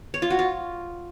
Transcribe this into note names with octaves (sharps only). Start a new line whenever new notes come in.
C#5
F4
F#4
F4